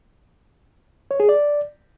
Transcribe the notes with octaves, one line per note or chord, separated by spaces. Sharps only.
C#5
G#4
D5